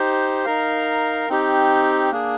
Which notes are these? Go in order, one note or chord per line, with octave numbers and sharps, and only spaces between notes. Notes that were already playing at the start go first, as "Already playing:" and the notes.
Already playing: D#4 G4 C5
D#4 A#4 F5
C4 D#4 G4
A#3 D4 G#4